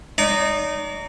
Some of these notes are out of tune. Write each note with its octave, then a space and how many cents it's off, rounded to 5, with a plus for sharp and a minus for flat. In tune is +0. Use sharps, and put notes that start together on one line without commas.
D#4 -20 D5 -45